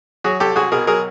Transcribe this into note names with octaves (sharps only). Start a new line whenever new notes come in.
F#3 F#4 G#4
C2 G4 A4
C2 F#4 G#4
B2 G#4 A#4
F#3 G#4 A#4